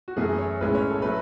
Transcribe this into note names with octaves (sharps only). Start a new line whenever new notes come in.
F#4
F#2 E3 A3 E4 G#4
C#5
B1 A2 G#3 C#4 B4
C#5
A4
F#3 A3 B4